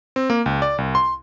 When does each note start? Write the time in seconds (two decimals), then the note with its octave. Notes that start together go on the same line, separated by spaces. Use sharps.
0.16 C4
0.30 A#3
0.46 C#2
0.62 D5
0.78 C2
0.95 C6